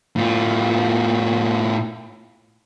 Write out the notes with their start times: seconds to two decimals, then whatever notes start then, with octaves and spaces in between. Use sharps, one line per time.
0.16 A2 F4